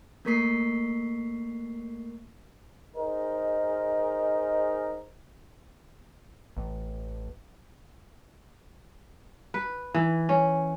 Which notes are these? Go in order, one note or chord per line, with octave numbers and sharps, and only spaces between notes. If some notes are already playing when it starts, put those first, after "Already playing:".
A3 A#3 A#4 C#6 B6 C7
D#4 G#4 A#4 C5 D#5
A1
B4
E3
C#4